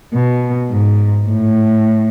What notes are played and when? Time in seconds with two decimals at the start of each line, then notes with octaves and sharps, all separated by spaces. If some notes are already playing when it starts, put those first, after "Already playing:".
0.13 B2
0.71 G#2
1.28 A2